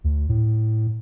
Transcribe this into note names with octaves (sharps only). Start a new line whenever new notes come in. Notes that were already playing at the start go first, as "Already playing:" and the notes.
D2
A2